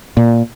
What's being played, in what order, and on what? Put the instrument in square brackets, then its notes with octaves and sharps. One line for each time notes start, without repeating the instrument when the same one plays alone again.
[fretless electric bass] A#2